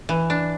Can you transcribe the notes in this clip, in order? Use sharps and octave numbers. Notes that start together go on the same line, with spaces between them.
E3
D4